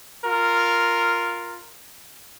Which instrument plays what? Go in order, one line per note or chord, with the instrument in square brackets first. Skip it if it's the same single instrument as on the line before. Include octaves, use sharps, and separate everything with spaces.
[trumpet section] F4 A#4